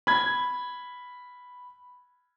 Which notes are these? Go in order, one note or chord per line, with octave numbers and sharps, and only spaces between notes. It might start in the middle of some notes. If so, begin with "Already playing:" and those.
B5 G#6